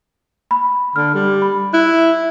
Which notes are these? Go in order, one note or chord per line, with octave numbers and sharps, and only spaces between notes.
B5
D3 F6
G3
B5
E4 F#6